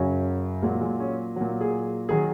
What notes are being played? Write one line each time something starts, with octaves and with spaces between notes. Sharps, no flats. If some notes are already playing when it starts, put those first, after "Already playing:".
Already playing: F#2 C#3 F#3 C#4
A#2 F#3 G#3
G#3
C#4
A#2 F#3
G#4
D#3 F#3 G#4